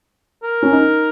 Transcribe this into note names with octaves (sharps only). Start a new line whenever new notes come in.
A#4
C#4
D#4